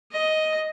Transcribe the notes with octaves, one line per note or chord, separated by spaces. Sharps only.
D#5